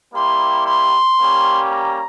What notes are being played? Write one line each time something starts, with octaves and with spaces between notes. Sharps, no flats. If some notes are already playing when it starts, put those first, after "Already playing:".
G3 A#3 E4 G4 C6
C6
G3 A#3 C#4 G4
A#5